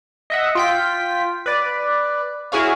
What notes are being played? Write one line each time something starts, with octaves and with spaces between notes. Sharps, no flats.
D#5 E5 F#5
F4 G5 B6
B4 D5
E4 F#4 G#4 C#5 F5